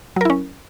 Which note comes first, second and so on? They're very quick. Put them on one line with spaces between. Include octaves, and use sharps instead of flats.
F#3 A#4 E4 C#4